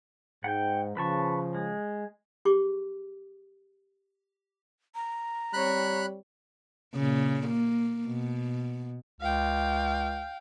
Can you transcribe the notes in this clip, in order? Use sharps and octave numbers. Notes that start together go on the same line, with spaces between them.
G#2 F#5 G5
C#3 F3 B4 A5 C#6
G#3
G4 G#4 C#6 D6
A#5
G3 C4 C#5 B5 F#6
A#2 C#3
A#3
B2
C#2 F5 G5